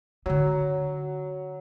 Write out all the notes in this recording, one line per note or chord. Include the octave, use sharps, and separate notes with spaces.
D3 F#3 D#4